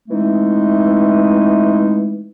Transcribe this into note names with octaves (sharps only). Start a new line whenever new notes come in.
E3 G#3 A3 C4 D#4